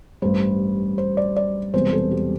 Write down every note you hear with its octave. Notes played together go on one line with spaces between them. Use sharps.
A1 G2 G3 C5
C5
D5
D5
E1 E2 C3 G3 C5
A4
G4